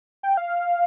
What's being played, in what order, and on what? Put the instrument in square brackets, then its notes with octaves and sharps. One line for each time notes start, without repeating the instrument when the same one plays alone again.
[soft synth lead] G5
F5